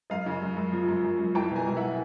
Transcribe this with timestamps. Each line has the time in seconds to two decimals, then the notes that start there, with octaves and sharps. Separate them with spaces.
0.10 F#2 D#5 F5
0.26 C#3
0.41 F#2
0.57 F#2
0.72 F3
0.88 F#2
1.04 F#2
1.19 F#2
1.35 C2 G5 A5
1.51 B2 G#5 A#5
1.67 C2
1.77 E5 F#5